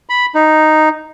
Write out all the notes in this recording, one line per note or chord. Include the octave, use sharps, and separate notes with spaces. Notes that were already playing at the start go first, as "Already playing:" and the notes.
B5
D#4